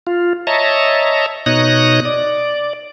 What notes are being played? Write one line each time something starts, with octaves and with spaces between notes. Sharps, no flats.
F4
C#5 D#5 E5 A5 A#5
B2 D#4 C#5 D#6 F#6 A#6
D5